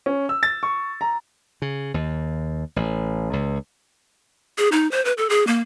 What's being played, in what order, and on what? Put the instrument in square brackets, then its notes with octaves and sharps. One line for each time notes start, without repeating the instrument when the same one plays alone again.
[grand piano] C#4
E6
A6
C#6
A#5
[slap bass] C#3
D#2
A1
C#2
[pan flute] G#4
D#4
C5
B4
A4
G#4
A#3